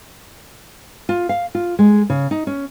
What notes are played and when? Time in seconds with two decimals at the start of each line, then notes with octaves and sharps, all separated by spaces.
1.09 F4
1.29 F5
1.55 F4
1.79 G#3
2.10 C#3
2.31 D#4
2.47 C#4